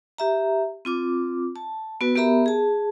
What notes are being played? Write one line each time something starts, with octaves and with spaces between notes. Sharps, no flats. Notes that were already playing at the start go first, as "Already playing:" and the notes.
G4 E5 A#5
C4 F4 D6
A5
B3 F#4 B4
B3 G4 A#4 E5 A#5 B5
G#4 A5